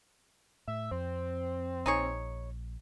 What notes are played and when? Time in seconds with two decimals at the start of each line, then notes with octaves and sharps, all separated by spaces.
0.68 A2 E5
0.91 F2 C4
1.86 A#1 D#4 G#4 C#5